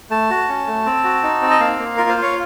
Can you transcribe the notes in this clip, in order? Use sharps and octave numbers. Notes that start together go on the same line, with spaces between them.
A3 A5
F#4
C#4
A3
C4
F#4
D#4
C4
D#5
A#3 F5
A#3
F4 A#4
C5
F4 C#5